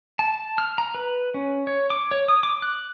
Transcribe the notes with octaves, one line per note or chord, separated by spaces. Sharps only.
A5
F6
A#5
B4
C#4
C#5
D6
C#5
D#6
D6
F#6